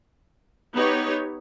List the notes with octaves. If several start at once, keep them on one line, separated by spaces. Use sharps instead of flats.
B3 D#4 G4 C#5